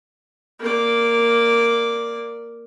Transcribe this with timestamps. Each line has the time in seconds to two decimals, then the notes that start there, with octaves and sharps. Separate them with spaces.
0.60 A#3 D5